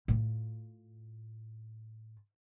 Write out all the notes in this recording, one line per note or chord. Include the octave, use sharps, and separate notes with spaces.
A2 F4